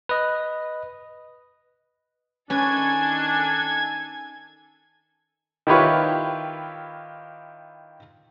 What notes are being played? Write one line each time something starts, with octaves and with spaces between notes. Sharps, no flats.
B4 D#5
D#3 C#4 D4 A4 B4 G#5 G#6
D#3 E4 F4 G4 B4 C#5